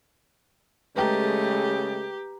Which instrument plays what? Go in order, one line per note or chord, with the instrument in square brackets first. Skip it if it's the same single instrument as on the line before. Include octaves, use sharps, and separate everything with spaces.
[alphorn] C#3 [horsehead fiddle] G#3 A3 [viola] G4 [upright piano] B4 G5 A#5